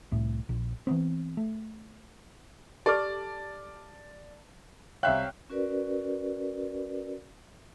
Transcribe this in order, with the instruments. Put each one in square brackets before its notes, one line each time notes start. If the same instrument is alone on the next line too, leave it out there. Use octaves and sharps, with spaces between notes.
[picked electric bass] C2 A2
A#1
E3 F#3 B3 C4
A3
[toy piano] G4 A4 D6 [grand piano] D5 [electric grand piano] A5 F6
[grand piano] C2 E5 F#6 [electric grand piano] C#5 F5 G5
[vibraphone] C#4 F#4 A#4 B4 D5